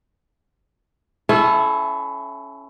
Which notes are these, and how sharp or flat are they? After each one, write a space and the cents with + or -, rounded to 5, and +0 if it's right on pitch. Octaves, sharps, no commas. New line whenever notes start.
C#4 +0 E4 +15 A4 -30